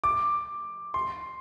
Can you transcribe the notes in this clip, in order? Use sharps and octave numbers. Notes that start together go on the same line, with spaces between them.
D6
C6